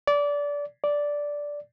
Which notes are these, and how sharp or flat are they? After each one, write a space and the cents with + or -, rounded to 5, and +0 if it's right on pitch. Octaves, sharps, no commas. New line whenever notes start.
D5 -25
D5 -10